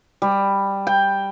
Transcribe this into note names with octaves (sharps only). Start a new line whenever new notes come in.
G3
G5